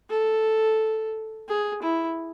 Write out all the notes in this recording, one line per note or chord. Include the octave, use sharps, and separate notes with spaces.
A4
G#4
E4